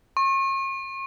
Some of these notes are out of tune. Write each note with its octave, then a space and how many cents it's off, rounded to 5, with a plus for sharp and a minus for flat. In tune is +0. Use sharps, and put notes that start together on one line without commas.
C#6 -40